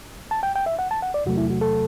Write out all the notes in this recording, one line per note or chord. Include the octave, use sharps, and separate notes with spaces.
A5
G5
G5
E5
F#5
A5
F#5
D5
E2 C3 F#3 A3 F#4
E4
F#4
A4